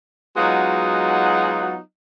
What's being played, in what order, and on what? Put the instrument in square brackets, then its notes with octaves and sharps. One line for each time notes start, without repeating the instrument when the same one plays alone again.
[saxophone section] F#3 G#3 B3 D#4 F4 F#4